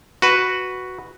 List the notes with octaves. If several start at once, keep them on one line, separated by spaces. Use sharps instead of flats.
F#4 B4